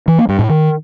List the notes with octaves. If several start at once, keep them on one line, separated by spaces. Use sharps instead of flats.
E3
A#3
G2
A2
D#3